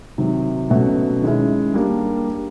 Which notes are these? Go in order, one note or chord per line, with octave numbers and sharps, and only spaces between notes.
C3 D#3 F#3
B2 F#3 A3 C#4 F#4
D#3 G#3 C#4 E4
G3 A#3 D4